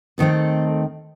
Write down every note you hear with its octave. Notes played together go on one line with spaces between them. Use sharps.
D#2 D#3 A3 C4 A4